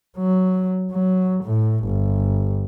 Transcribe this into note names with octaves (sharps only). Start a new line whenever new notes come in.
F#3
F#3
A2
G1